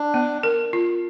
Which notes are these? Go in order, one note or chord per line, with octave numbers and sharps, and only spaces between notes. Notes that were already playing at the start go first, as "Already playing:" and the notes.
Already playing: D4
B3
A#4
F4